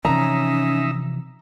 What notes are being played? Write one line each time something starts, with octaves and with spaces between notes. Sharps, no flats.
C3 E3 F3 C#4 D#4 E5 A#5